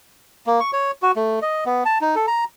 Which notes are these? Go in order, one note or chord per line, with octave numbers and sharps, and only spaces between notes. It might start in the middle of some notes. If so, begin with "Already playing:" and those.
A#3
C#6
C#5
F#4
A3
D#5
B3
A5
D#4
A4
A#5